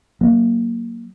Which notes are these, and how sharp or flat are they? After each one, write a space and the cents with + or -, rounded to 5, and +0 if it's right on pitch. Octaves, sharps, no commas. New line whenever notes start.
F#3 +10 A#3 +0